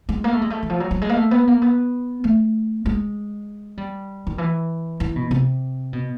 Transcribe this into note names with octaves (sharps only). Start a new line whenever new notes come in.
G#3
A#3
A3
G#3
A3
E3
F3
F#3
F#3
G#3
A#3
A3
B3
A#3
B3
A3
G#3
G3
D#3
E3
E3
B2
C3
B2